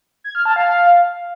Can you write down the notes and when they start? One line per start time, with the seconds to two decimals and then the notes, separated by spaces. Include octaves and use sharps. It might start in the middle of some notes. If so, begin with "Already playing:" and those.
0.24 G#6
0.35 F6
0.45 A5
0.56 F5